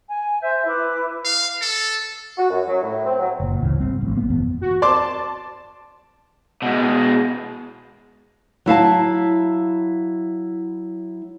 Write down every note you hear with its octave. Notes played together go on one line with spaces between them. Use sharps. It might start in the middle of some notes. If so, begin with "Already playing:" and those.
G#5
C5 E5 G6
E4 B4 D6
F5
A4
F#4
F#2
F#3
A2
C4
F#3
F#1 A#2
G#1 D2 C#3 E3
G3 C4
A#1 A2
A#1 A#3 B3
F#1 F2 E3 B3
F#4
D5 A5 C6 D6
B2 G#3
F#3 E4 F5 A5